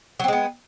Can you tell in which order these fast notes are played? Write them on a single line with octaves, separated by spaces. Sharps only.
F#3 C4 G#3 B3